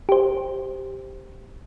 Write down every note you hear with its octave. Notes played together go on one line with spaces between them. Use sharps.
G4 C5